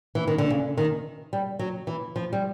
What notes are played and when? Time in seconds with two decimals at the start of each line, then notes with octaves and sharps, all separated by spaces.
0.15 E3
0.28 D#3
0.38 D3
0.50 C#3
0.77 D#3
1.33 G3
1.59 F#3
1.87 E3
2.16 F3
2.33 G3